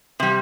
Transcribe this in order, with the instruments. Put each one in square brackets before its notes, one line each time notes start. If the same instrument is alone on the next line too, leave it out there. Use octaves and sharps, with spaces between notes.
[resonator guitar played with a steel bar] C3 G3